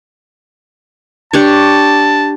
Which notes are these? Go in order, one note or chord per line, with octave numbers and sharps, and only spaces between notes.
D4 G4 C#5 A5